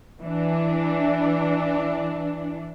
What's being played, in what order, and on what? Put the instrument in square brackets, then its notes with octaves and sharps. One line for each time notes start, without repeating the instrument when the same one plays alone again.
[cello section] E3 D4